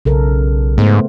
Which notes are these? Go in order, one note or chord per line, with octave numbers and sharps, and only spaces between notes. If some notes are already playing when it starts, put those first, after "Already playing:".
B1 C#3 A4 A#4
G#2 A3 B3 C5